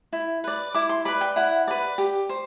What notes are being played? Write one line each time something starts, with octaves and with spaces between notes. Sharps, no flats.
E4
B4 D5
E4 D6
C6
B4 D5 B5
G5
E4 F#5
B4 D5
G4
C5